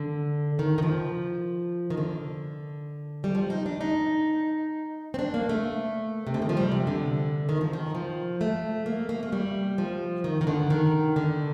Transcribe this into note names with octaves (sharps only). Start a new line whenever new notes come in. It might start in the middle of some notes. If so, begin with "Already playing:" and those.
Already playing: D3
D#3
D#3
F3
D#3
D3
G3
F3
D#4
D4
D#4
C4
D4
A#3
A3
C3
D3
D#3
F3
G3
C3
D3
D#3
F3
D#3
F3
A3
A#3
A#3
A3
G3
F3
D#3
D#3
D3
D#3
D3